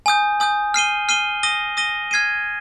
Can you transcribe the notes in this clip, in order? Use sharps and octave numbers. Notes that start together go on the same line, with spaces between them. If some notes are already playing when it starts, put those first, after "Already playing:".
G#5 D#6 G6
G#5 D#6 G6
F6 C7 D#7 G7
F6 C7 D#7 G7
D#6 A#6 D#7 G7
D#6 A#6 D#7 G7
F6 G#6 C7 D#7